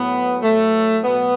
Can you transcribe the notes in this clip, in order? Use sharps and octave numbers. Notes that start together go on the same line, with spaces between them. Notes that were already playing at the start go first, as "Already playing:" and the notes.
Already playing: A2 F#3 B3
A2 F#3 A3
B2 F#3 B3